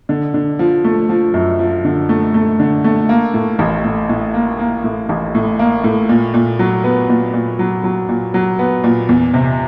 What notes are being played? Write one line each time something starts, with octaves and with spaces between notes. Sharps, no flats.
D3
D3
F3
A3
F3
F#2
F3
D3
A3
A3
D3
A3
A#3
A2
A1
A2
A2
A#3
A#3
A2
A1
A2
A#3
A2
A#2
A#2
F#3
B3
A#2
A#2
F#3
F#3
A#2
F#3
B3
A#2
E2
C3